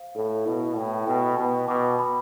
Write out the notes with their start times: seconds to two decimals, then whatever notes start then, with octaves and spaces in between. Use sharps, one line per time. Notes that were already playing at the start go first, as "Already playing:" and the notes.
Already playing: C5 F5
0.16 A2 A4
0.46 B2 E4
0.76 A2 G5
1.07 B2 G5
1.38 B2 G5
1.68 B2 D6
1.99 B5